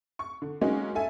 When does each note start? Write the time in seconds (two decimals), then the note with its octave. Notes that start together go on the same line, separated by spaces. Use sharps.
0.19 C#6
0.42 D3
0.61 G#3 A#3 C#4 D#4 F#4
0.95 A4 E5 G#5